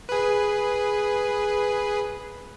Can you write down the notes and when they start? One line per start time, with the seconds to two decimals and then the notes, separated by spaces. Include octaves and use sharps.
0.09 G#4 B4